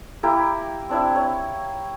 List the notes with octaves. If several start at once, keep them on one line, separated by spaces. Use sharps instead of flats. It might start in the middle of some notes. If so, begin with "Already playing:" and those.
A#3 E4 G4 A#4
C4 D4 E4
C#5